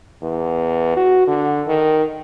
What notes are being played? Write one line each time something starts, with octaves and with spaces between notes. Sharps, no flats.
E2
F#4
D3
D#3